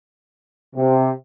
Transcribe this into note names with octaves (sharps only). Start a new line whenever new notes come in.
C3